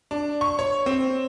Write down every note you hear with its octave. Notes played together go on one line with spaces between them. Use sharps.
D4
C#6
C#5
C4